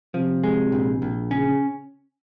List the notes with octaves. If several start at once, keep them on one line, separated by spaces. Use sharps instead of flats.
C3 F3
G#3
A#1
A#1
C#3 C#4